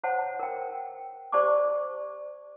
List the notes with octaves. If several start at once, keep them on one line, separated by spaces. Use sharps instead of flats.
C5 C#5 F#5 A5
A#4 G5
G4 C5 D5 A5 C#6 D6